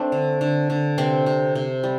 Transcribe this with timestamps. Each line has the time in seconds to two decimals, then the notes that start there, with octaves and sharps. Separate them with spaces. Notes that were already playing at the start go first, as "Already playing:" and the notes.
Already playing: A3 C4 D4
0.12 D3
0.41 D3
0.70 D3
0.98 C3 C4
1.26 C3
1.55 C3
1.83 G3